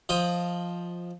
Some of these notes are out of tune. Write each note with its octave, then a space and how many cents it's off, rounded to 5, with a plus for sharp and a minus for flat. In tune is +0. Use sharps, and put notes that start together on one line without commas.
F3 +5 D#5 +0 G5 +15